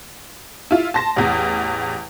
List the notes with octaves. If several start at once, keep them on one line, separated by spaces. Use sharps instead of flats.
E4 F4
A5 C6 A#6
A1 E2